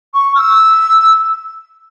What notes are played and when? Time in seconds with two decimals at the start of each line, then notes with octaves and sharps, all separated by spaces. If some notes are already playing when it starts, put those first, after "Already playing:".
0.14 C#6
0.35 F6
0.38 E6